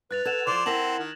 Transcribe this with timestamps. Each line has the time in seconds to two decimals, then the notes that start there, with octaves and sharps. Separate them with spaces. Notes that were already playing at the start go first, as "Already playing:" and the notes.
0.11 G2 B4 F#6 A6 F7
0.25 A4 F#5 G#6 E7 F7
0.47 D#3 F3 C5 D5 F#6
0.66 C4 E4 A#4 F#5 A5 A#6 F#7
0.99 D#3